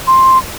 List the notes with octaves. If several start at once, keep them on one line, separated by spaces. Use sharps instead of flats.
C6